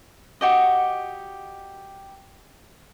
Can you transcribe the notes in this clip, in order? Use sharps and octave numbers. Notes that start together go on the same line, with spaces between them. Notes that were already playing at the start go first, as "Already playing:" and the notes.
F#4 G4 D#5